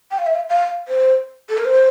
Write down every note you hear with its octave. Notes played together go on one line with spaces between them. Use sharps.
G5
F5
E5
F5
F5
C5
A4
A#4
C5